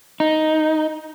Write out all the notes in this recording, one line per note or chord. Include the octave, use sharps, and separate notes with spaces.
D#4